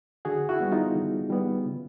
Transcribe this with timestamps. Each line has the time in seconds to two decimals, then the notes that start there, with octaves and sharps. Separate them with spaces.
0.25 D3 F#4 G#4
0.49 E4 F#4
0.60 G3 B3
0.72 D#4 F4
0.95 D3
1.30 G3 B3
1.66 C#3